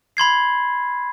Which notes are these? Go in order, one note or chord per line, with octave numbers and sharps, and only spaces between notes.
B5 C6 G#6 C7